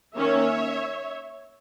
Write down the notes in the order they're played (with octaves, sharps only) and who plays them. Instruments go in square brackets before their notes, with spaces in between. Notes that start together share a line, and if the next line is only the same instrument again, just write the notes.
[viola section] D#3 A#3 C#4 C#5 E5